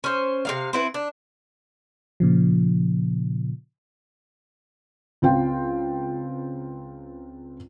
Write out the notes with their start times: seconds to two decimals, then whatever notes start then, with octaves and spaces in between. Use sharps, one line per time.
0.04 C#4 C5
0.45 C3 A#3 F5
0.73 C4 E4 B4
0.94 D4
2.20 A#2 C#3 F3
5.22 C#2 C4 F4 G5